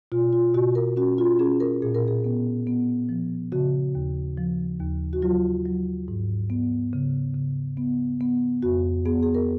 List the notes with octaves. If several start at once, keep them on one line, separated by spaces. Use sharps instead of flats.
B2 F4
F4
B2 F#4
A#4
C#4 F#4
F4
C#4 G#4
A#4
A#2 G#4
A#4
G#4
B3
B3
F3
C#3 F#4
D#2
F3
D#2
F#4
F#3 F4
F#3
G#2
B3
C#3
C#3
B3
B3
F2 F#4
B3 G#4
G#4
A#4